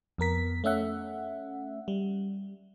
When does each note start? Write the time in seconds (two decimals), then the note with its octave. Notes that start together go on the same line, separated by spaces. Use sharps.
0.18 F2 B3 A#4 B6
0.64 A3 C#4 E5 F#5
1.88 G3